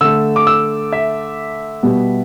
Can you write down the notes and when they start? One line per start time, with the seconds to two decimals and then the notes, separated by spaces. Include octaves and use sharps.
0.01 D3 A3 E6
0.36 D6
0.47 E6
0.92 E5
1.83 B2 G3 B3